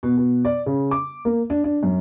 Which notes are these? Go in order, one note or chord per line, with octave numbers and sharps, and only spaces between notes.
B2
B2
D5
C#3
D6
A#3
D4
D4
F#2